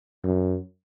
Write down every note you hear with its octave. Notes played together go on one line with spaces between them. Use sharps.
F#2